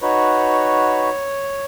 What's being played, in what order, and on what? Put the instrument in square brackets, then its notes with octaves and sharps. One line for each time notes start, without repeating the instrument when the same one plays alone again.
[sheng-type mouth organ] D#4 F#4 B4 [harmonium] C#5